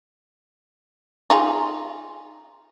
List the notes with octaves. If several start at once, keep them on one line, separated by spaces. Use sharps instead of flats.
D#4 F4 G#4